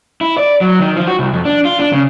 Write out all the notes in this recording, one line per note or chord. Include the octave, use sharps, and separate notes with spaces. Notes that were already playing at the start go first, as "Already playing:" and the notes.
E4
D5
F#3
D#3
F3
F#4
C2
F2
D4
F4
D4
C#3